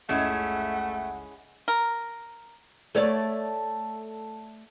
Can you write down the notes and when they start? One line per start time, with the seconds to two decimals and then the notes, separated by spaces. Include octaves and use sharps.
0.09 F#1 C#2 G#3 A3 C#4 E4 F#5
1.68 A#4
2.95 A3 C#5 D5